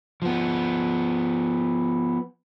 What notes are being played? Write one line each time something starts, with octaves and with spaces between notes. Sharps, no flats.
F3 B3